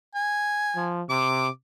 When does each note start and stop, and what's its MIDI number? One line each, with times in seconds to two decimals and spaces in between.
0.15 0.94 80
0.76 1.03 53
1.09 1.48 48
1.09 1.49 86